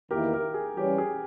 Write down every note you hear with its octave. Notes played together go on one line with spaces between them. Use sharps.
E2 D#3 A#3 E4 G4 A#4
G4 A#4
G#4
E3 G3 C#4 G4
G#4